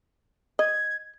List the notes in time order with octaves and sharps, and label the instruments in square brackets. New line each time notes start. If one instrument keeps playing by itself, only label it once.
[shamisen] D#5 [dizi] G#6